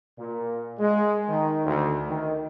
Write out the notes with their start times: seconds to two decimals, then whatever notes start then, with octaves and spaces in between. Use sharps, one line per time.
0.18 A#2
0.79 G#3
1.28 D#3
1.64 D2
2.09 D#3